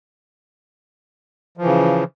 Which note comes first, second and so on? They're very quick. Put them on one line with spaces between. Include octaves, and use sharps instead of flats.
F3 E3 C#3